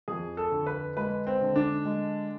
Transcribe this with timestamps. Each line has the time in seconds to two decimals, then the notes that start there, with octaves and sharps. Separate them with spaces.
0.08 F2 G#4
0.37 A4
0.51 D3
0.66 B4
0.97 G#3 B4
1.27 C4
1.41 D3
1.56 D4
1.85 G#3